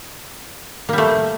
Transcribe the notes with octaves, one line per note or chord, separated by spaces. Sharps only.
G3 A3 A#3